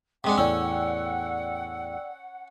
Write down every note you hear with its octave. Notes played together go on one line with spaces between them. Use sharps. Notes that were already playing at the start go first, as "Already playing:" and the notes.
C3 G#3 D4 F#5
E2 A2 C#4 D5 G5 E6